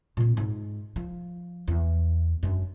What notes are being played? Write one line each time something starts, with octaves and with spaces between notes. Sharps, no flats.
A#2 C4
G#2
F3
E2
F#2 D4